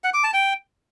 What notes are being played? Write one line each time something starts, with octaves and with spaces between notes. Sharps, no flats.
F#5
D6
A5
G5